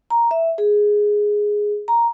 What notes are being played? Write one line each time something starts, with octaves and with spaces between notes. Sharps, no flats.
A#5
E5
G#4
A#5